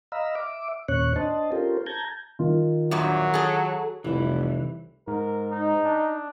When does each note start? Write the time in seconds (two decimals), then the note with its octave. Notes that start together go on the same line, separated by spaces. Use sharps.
0.12 D#5 F5 A#5 B5 E6
0.35 E5 D6
0.88 D#2 A#2 C#4 C#5 C#6 F#6
1.16 D4 C5 D#5 A5
1.52 C#4 F4 G4 A4 A#4 C5
1.86 A5 A#5 G6 G#6
2.39 D#3 F4
2.91 E2 G2 A#2 F#3
3.34 G#4 A4
4.04 F1 C2 E3 G3 E4
5.07 G#2 A#4
5.51 D#4
5.85 D4